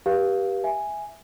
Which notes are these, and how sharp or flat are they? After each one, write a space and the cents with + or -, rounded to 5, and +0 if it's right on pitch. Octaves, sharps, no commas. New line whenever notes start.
G4 +0 B4 -40 F5 +0
E5 +0 G#5 +0